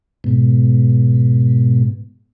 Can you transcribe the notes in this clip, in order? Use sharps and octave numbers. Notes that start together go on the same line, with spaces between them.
G#2 B2